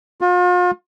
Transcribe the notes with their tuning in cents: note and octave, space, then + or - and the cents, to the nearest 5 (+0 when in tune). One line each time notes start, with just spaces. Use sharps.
F4 +40